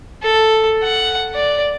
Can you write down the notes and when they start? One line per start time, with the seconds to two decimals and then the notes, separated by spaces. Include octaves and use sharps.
0.23 A4
0.84 F#5
1.34 D5